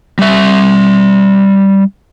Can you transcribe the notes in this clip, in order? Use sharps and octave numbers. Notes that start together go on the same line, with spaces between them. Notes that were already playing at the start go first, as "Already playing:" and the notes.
G3 E5